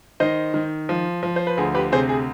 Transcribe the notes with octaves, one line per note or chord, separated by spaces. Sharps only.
D#3 C5 D#5
D#3
F3
F3
C5
B4
D2 G#4
G4 B4
C3 G#4 C5
G#4